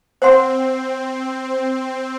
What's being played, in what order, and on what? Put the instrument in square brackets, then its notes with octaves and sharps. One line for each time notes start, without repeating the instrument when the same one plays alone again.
[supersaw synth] C4 [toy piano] C5 F#5 C6